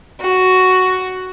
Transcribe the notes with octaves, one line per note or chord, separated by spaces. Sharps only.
F#4